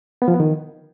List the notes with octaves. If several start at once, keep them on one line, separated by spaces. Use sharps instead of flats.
B3
F3
B3
D#3